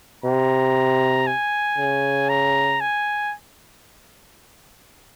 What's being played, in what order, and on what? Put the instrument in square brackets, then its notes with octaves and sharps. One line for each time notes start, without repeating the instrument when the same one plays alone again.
[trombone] C3 [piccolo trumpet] A#5
[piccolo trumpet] G#5
[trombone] C#3
[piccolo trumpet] A#5
G#5